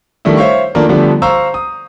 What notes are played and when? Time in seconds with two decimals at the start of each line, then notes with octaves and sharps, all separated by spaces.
0.25 D#3 G3 A3 D4 E4
0.37 C5 C#5 E5 F5 C#6
0.75 D#3 A3 A#3 D4 F4 A#4
0.89 D3 F3 G3 A3 B3 D4
1.22 C5 F5 A#5 C#6 E6
1.54 D#6